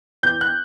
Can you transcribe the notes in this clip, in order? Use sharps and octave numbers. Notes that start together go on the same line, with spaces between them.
E2 G6
F#6